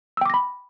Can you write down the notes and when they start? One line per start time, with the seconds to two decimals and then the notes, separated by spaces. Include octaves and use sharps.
0.17 E6
0.21 G5
0.26 D6
0.30 A#6
0.34 B5